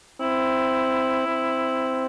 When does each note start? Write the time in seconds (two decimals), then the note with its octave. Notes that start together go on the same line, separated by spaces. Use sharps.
0.21 C4 E4
1.28 C4